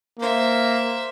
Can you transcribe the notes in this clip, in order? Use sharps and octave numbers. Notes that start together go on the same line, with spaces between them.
A#3 C5 E5